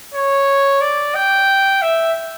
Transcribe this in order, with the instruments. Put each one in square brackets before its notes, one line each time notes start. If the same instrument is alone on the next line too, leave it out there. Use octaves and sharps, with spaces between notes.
[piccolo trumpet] C#5
D5
G5
E5